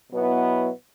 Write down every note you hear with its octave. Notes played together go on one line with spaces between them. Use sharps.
B2 F#3 B3 E4